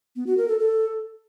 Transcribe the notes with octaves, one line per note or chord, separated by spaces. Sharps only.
B3
F#4
A#4
A4
A4